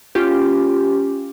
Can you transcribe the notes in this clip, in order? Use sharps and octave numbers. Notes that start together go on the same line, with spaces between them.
C#4 F4 G4